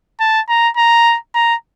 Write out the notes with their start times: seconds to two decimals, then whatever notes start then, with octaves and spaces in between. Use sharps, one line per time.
0.21 A5
0.49 A#5
0.77 A#5
1.35 A#5